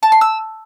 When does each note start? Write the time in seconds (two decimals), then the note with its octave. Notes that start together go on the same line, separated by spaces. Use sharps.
0.03 A5
0.12 C6
0.21 E6